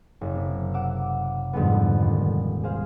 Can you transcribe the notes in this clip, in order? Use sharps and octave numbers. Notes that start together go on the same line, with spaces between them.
F#1
C3
F#5 D6 E6
F2 G#2 D3 G3 B3
D#1
G#4 C5 F5